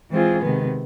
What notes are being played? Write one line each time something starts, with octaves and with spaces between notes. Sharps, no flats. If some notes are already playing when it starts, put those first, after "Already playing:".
E3 G#3 C4 F4 G#4
C3 D#3 G#3 B3